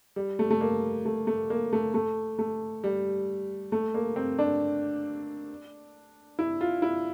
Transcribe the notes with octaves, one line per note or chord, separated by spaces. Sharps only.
G3
A3
A3
A#3
A3
A3
A#3
A3
A3
A3
G3
A3
A#3
C4
D4
E4
F4
E4